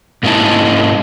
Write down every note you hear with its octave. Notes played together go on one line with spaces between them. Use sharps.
G#2 A#3 C#4 D#4 E4 A5